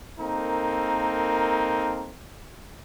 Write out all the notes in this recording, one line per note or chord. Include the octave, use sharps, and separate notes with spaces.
A#3 C4 D#4 A4 A#4